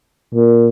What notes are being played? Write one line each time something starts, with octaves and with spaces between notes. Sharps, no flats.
A#2